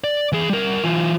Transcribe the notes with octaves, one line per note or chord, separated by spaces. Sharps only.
D5
E3 G#4
G3 A#4
E3 F4